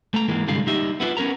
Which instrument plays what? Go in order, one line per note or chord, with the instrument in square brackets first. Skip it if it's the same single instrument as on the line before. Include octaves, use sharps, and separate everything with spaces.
[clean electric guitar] A3 A#5
G#2 E3 G#3 A#3
C2 G2 D3 G3 G#3 F5
G3 D#4 G4 D#5 E5
B3 E4 F4 B4
B3 C#4 A#4 B4 A#5